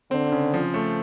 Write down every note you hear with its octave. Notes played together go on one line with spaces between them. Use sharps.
D3 C4
C#3
F3
A3